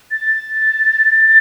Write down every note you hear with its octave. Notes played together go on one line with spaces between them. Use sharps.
A6